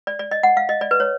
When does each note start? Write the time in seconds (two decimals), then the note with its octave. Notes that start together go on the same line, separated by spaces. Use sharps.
0.07 D5
0.19 D5
0.31 D#5
0.43 F#5
0.57 F5
0.69 D#5
0.81 D5
0.91 B4
1.00 C#5